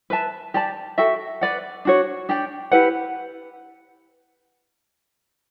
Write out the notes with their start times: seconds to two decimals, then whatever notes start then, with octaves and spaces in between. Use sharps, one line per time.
0.10 B4 E5 A5
0.54 G4 D5 A5
0.98 F#4 A4 E5 G5
1.41 B4 D5 F#5
1.85 D4 F#4 C#5
2.29 D4 G4 D5 G5
2.72 E4 G4 B4 F#5